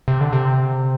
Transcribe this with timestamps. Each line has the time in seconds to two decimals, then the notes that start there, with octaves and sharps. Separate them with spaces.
0.08 C3
0.21 D3
0.33 C3